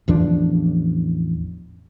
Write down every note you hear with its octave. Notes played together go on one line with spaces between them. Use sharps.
A1 E2 F3 D4